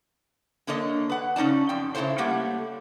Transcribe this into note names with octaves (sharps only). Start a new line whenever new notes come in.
D3 A#3 A4 C#5 D#5
B4 F#5
C#3 C#4 D#4 D5 A5
F2 G5
C#3 E4 F4 A4 C5 C#5
G3 A3 A#3 G4 C#5 F#5